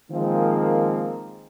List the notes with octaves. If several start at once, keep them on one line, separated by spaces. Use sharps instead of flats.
D#3 F3 G#3 A#3 C4